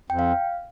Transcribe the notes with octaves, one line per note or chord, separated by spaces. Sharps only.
F2 G5
F5